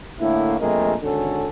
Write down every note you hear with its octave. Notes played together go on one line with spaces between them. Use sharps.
A2 D3 A#3 E4
A#1 F2 G#3 A3 A#4
G#1 D3 C#4 A4